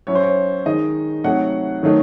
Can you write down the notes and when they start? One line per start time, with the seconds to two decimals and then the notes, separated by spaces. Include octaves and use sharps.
0.07 F#3 C#4 E4 C#5
0.15 C5
0.23 C#5
0.66 D#3 G#3 D#4 D#5
1.24 C3 F#3 A3 D#4 F#5
1.83 D#3 F#3 A3 D#4